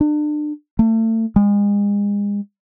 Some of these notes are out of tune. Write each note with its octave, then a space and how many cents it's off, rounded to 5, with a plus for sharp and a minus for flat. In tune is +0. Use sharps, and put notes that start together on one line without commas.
D4 +35
A3 +30
G#3 -35